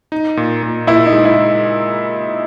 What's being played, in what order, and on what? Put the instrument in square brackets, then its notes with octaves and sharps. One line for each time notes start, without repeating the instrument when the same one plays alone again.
[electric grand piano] D#4
A#2
A#2
[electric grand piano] A#2 [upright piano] E4
[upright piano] D#4
[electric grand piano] G#3
[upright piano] E4